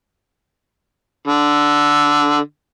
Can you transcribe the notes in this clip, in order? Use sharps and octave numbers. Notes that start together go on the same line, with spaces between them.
D3